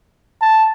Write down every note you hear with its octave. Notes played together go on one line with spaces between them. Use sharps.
A5